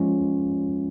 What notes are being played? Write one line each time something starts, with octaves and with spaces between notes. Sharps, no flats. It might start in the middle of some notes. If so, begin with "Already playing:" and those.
Already playing: F3 G#3 C#4 F4